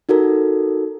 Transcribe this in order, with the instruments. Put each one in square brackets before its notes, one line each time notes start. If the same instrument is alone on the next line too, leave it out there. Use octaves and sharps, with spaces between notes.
[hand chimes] D#4 F#4 A4 A#4